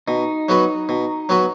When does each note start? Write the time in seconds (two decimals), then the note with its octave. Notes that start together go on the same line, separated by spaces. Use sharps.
0.08 B2 D#4
0.49 F#3 B3 F#4 B4
0.89 B2
1.29 F#3 B3 F#4 B4